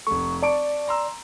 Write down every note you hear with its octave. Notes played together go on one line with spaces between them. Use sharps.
F1 A3 C#6
D5 A5 C#6 D7
A#5 C6 E6